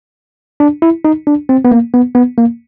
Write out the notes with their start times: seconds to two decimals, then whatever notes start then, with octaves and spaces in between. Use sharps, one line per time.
0.60 D4
0.82 E4
1.05 D#4
1.27 D4
1.49 C4
1.65 B3
1.72 A#3
1.94 B3
2.15 B3
2.38 A#3